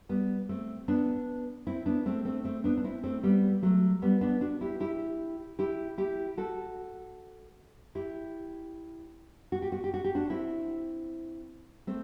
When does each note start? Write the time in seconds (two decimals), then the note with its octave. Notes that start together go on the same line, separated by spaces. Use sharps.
0.09 G3 B3
0.49 A3 C4
0.88 B3 D4
1.67 C4 E4
1.86 B3 D4
2.06 A3 C4
2.25 A3 C4
2.44 A3 C4
2.64 B3 D4
2.77 D4
2.84 C4 E4
3.03 A3 C4
3.23 G3 B3
3.62 F#3 A3
4.02 G3 B3
4.21 B3 D4
4.41 D4 F#4
4.61 E4 G4
4.80 E4 G4
5.59 E4 G4
5.98 E4 G4
6.37 F#4 A4
7.95 E4 G4
9.52 F#4
9.62 G4
9.72 F#4
9.84 G4
9.94 F#4
10.04 G4
10.15 D4 F#4
10.30 C4 E4
11.87 A3 C4